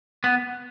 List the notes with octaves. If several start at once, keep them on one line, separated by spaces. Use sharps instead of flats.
B3